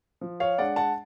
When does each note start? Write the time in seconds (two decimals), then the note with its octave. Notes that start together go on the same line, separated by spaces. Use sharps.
0.21 F3
0.40 C#5 F5
0.58 G#3 D4 D5 F#5
0.76 F#5 A5